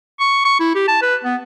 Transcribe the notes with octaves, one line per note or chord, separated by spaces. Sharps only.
C#6
C#6
E4
G4
A5
B4
B3